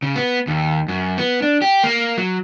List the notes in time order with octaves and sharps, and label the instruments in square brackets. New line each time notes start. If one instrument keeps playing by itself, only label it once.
[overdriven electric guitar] C#3
B3
D#2
F#2
B3
D4
G4
A#3
F#3